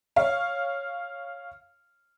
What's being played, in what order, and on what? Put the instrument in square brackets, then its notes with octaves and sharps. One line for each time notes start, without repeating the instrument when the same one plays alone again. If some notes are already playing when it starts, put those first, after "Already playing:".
[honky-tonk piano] C#5 F5